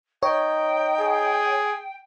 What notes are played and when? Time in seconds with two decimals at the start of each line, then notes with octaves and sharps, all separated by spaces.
0.23 D#4 C#5 G5
1.00 G#4